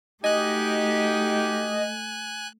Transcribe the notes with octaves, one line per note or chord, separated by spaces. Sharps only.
A3 D#4 F#4 G4 D#5 G#5 F#6